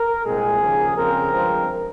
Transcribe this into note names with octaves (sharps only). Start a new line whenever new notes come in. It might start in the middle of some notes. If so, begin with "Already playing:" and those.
Already playing: A#4
C2 A#2 G#3 C4 G#4
D#2 C#3 F3 A#3
F2 C#3 F3 C4 A#4
G2 F3 G#3 C4